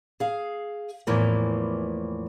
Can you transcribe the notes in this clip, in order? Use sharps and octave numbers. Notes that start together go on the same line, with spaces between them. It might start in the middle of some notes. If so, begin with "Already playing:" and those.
G#4 F5
E2 A2 E3 F3 A#3